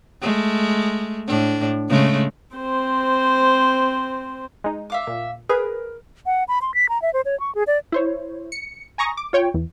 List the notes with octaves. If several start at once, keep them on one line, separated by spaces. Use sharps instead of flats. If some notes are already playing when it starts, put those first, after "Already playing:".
G#3 A3
A2 D4
C#3 G#3 A3
C4 C5
G#3 D#4
E5 F5 D6
A#2
G#4 A#4 B4
F#5
B5
C6
B6
A#5
E5
C5
C#5
C#6
G#4
D5
E4 C5 C#5
C#7
G#5 A#5 C#6 D#6 A#6
D6
F4 C#5 G5
E2